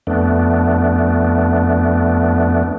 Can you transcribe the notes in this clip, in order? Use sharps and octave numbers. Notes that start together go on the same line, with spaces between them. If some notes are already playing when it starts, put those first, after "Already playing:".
F2 A3 B3 D4